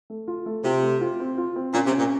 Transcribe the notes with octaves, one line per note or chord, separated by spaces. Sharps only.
A3
F4
A3
C3 F4
A3
F4
C4
F4
C4
A#2 C#4
C3
C#4
A#2